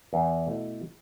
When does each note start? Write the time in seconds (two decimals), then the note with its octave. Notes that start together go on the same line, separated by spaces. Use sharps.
0.13 E2
0.47 B2 A3 E4